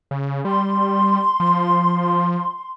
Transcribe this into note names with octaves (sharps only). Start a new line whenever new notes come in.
C#3
G3 C6
F3